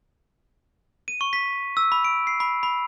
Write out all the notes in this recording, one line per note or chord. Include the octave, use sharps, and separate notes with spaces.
D#7
C#6
B6
E6
B5
D7
C7
B5
B5